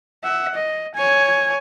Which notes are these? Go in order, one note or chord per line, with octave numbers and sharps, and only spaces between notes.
E5 F#5
D#5
C#5 G#5